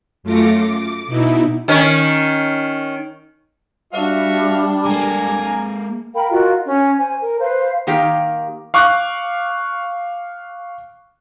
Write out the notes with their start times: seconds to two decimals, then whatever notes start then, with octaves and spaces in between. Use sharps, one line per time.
0.23 F#2 A3 F4 D6 A#6 C#7
0.56 D6
1.07 B2 D#4 E4
1.68 D#3 C#4
3.93 G3 D4 F#4 E5 F5
4.85 G#3 A#3 G#5 A#5
6.14 A#4 F5 G5 B5
6.31 F4 F#4 A#4 D#5
6.66 C#4
6.98 C5 G#5
7.22 A#4
7.40 B4 C5 F5
7.87 D#3 A#3 D#4 G4 F5 G5
8.74 F5 C#6 D6 F#6